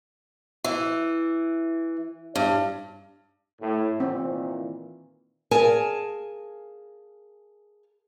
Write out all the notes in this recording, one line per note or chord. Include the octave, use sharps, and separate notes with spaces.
E3
G2
A2
A#2 D#3 E3 C4
G#4 A#4 F5 G#5 A5